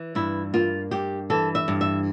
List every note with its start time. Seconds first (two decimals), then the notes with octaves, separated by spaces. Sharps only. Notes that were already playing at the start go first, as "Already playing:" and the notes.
Already playing: E3
0.15 G2 E4
0.53 A#3 F4
0.91 G2 G4
1.30 E3 A4
1.55 E5
1.68 G2
1.81 E5